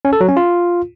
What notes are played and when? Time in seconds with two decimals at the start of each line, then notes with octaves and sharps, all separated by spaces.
0.05 C#4
0.13 A4
0.21 F#3
0.29 C#4
0.37 F4